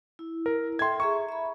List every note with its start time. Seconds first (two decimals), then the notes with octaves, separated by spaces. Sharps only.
0.19 E4
0.46 A#4
0.79 A4 E5 G5 C6 G#6
1.00 G#4 E5 A#5 C#6
1.29 E5 B5